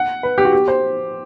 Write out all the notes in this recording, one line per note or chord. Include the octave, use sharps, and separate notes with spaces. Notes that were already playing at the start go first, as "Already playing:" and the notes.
Already playing: F#5
B4
G4
F#4
G4
C5